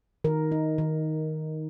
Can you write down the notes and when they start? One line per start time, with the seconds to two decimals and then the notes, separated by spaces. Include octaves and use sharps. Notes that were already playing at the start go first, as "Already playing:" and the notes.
0.24 D#3 A#4
0.52 D#4
0.78 D#3